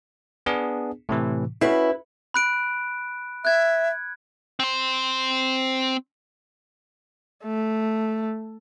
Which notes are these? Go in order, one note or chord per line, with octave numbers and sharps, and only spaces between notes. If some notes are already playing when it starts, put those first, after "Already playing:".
B3 D4 G#4
A2 C3 E3
C#4 E4 F#4 B4
B5 F#6 D7
E5 F#6 G#6
C4 C5
A3